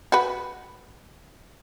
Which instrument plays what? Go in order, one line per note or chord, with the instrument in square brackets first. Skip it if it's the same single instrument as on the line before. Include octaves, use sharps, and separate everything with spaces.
[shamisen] F#4 B4